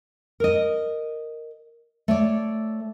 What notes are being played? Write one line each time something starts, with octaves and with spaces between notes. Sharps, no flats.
A#4 D#5
A3 C#5 D5